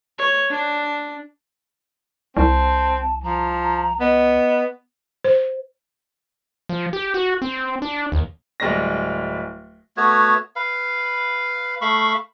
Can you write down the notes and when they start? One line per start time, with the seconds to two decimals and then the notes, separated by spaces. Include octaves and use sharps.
0.18 C#5
0.51 D4
2.37 C2 C4 A5
3.23 F3 A#5
4.00 B3 D#5
5.25 C5
6.69 F3
6.93 G4
7.14 F#4
7.42 C4
7.82 D4
8.12 D#2
8.60 D1 G3 G#3 A#6
9.97 A3 B3 F#4 C#5
10.56 B4 F5
11.81 A3 F5 B5 C#6